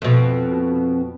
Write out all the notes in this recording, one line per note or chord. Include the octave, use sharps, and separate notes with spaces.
F2 B2